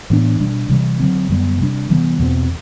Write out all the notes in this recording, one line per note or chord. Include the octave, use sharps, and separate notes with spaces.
A2 E3 B3 D4
B2 G3 D4
C3 E3 G3
D3 F#3 A3 C4
F#2 D3 G3 B3
C3 G3 D4
C3 E3 G3 B3
E2 B2 A3 C4